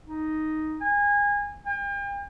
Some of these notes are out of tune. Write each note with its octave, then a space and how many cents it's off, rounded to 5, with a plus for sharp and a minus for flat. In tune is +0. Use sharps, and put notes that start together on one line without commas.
D#4 +0
G#5 -25
G5 +45